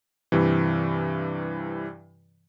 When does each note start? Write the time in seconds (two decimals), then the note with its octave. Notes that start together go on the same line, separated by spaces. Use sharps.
0.32 G2 C3 E3